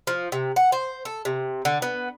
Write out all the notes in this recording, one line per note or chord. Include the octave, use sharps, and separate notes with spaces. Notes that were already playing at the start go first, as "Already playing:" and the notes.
F3
C3
F#5
C5
A4
C3
D3
B3